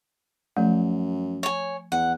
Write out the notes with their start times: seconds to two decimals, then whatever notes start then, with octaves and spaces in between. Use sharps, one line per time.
0.57 F#2 F3 A3
1.43 C#5 G#5
1.92 E2 F#5